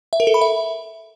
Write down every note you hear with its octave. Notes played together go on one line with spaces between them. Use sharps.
E5
A#4
A4
B5
E5